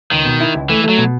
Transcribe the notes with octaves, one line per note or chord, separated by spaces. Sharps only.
C#2 D#3
B2
E4
C#2
E3 A3
F#3 A3
B2